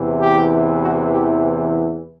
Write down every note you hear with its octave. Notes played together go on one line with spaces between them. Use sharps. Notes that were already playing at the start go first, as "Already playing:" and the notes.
Already playing: E2 C3 E3
G4
F#4
G4